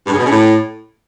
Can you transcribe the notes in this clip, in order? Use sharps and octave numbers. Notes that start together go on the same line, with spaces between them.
G2
C#3
B2
C#3
A2